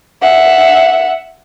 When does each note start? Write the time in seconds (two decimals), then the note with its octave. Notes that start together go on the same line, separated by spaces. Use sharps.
0.22 E5 F#5